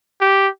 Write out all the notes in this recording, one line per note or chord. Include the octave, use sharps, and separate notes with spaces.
G4